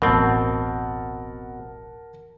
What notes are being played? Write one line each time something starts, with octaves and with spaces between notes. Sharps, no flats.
D1 A1 B2 C4 A#4 F#5 A5